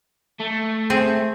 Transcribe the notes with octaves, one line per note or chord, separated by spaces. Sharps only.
A3
C4 G#4